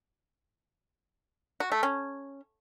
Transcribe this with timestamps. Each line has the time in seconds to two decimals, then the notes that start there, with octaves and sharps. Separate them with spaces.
1.60 F#4
1.72 A3
1.83 C#4